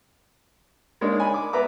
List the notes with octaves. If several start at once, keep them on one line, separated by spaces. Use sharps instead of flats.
G#3 A#3 D4 D#4 C#5 D5
G#5 B5
D6
B3 B4 D5 E5 A#5 D6